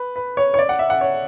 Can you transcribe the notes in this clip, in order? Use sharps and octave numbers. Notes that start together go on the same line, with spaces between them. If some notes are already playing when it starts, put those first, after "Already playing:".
Already playing: B4
B4
C#5
C#5
D5
F#5
E5
F#5
C#5